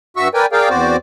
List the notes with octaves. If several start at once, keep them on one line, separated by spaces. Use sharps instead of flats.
G2 F#4 E5 C#6 E6
A#4 B4 D5 G5 G#5
G#4 A#4 D5 F5 G5
E2 C4 F#4 C5 D5